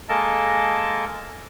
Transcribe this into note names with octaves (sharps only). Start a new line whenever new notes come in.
G#3 A#3 A4 A#4 D#5 A5